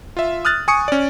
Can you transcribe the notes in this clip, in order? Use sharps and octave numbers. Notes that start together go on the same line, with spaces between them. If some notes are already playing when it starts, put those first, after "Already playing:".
F4 E5
D#6 F6 F#6 A6
G#5 C#6 D#6 C#7
C#4 D5